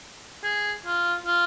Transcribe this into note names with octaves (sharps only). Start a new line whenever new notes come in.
G#4
F4
F4